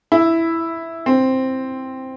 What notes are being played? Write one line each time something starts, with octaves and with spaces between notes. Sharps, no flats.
E4
C4